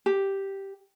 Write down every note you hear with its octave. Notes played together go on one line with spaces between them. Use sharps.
G4